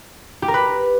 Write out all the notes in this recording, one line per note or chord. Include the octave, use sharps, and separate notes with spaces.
G4
A#4
B4